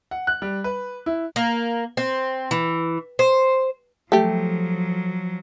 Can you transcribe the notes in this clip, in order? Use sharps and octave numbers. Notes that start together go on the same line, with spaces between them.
F#5
F#6
G3
B4
E4
A#3
C4
E3
C5
F3 F#3 A3 G4